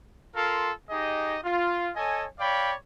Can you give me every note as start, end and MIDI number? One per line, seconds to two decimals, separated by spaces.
0.35 0.71 65
0.35 0.71 69
0.35 0.71 70
0.35 0.71 77
0.35 0.71 84
0.90 1.38 63
0.90 1.38 67
0.90 1.38 68
0.90 1.38 75
1.44 1.91 65
1.95 2.25 69
1.95 2.25 73
1.95 2.25 75
1.95 2.25 80
2.39 2.73 73
2.39 2.73 74
2.39 2.73 77
2.39 2.73 79
2.39 2.73 83